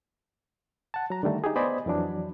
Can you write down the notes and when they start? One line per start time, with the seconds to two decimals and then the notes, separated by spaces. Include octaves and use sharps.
0.94 F#5 A5
1.10 F#3 A#5
1.23 D3 D#3 G3 A3
1.44 D#4 G4 G#4
1.56 B3 C5 D5 D#5 G#5 B5
1.86 F2 E3 F#3 D4